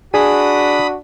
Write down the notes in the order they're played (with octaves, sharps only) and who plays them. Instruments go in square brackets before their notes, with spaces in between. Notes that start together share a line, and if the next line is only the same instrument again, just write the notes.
[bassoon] D4 [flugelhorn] F#4 [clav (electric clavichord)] G#4 [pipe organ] B5 D#6